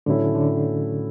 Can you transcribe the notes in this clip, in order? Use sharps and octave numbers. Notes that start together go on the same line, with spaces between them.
A2 D3 F#3 A3 C#4 E4
D3